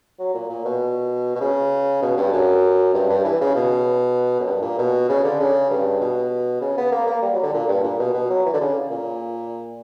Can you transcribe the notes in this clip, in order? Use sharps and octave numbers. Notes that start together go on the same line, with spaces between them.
F#3
A#2
A#2
B2
B2
C#3
B2
G2
F#2
G2
G2
E3
C#3
B2
F#2
G2
A#2
B2
C#3
D3
C#3
G2
B2
C#3
B3
A#3
A#3
G3
F#3
D3
A#2
G2
A#2
B2
B2
F#3
E3
D3
C#3
A#2